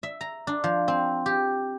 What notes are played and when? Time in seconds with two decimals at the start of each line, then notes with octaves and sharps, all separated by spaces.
0.03 E5
0.21 A#5
0.47 D4
0.64 F3
0.88 C4
1.26 G4